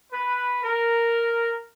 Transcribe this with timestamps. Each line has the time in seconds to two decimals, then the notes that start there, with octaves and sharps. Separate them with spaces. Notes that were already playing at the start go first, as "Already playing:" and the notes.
0.12 B4
0.63 A#4